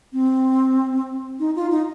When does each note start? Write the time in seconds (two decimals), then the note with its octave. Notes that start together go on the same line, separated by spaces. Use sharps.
0.13 C4
1.39 D#4
1.56 F4
1.71 D#4